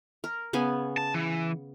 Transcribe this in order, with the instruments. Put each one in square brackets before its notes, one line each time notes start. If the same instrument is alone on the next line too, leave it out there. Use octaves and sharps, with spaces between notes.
[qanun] A#4
C#3 B3 G#5
[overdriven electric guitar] A5
E3